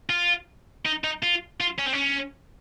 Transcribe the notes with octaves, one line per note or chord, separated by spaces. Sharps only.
F4
D#4
D#4
F4
F4
C#4
C4
C#4